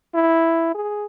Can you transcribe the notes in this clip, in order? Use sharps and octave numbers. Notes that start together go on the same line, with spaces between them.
E4
G#4